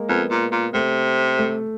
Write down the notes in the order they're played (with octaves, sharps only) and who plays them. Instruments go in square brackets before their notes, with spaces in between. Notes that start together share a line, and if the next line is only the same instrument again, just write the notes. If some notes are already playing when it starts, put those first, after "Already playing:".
Already playing: [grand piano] G#3 A#3
[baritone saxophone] F2 [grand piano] B3
[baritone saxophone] A#2
A#2
[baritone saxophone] C3 [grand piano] A3
[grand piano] A3